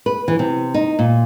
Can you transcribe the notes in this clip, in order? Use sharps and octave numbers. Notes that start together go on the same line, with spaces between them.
B4
E3
C3
D#4
A#2